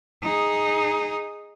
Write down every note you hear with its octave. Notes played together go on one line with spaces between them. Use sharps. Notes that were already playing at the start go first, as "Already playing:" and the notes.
D#4 G#4